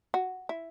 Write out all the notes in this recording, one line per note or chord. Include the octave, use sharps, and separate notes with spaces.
F#4
E4